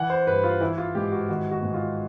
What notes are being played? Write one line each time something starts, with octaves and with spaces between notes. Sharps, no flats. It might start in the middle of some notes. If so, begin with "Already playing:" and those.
Already playing: E3 F#5
C5
G2 B4
F4
E3 E4
F4
G#2 G4
F#4
D#3 F#4
F#4
G#2
F4